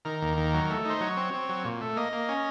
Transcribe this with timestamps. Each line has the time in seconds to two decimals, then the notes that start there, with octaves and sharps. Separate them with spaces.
0.05 D#3 A#4
0.22 D#2
0.37 D#3
0.54 F#3
0.70 A3
0.85 D#4 C5
1.01 F#3 C#5
1.17 C4
1.34 C4
1.49 F#3
1.65 A#2
1.81 A3
1.96 A#3 D#5
2.13 A#3
2.29 C#4